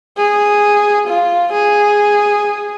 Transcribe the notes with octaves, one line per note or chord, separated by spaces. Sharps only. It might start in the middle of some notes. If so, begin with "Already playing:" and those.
G#4
F4
G#4